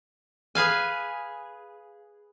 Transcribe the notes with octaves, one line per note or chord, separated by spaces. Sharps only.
G#4 B4 F5 G#5